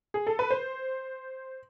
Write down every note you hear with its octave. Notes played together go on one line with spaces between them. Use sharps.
G#4
A4
B4
C5